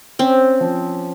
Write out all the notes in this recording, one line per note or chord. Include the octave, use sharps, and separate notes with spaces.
C4 C#4
F3